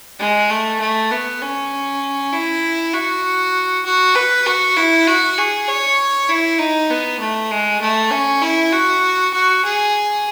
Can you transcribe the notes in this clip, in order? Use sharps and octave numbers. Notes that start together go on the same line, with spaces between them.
G#3
A3
A3
B3
C#4
E4
F#4
F#4
B4
F#4
E4
F#4
G#4
C#5
E4
D#4
B3
A3
G#3
A3
C#4
E4
F#4
F#4
G#4